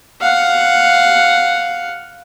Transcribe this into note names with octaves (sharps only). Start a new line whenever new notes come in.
F5 F#5